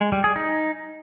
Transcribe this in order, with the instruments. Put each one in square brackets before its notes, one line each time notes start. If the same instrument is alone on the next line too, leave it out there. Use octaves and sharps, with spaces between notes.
[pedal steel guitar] G#3
G3
G#4
D#4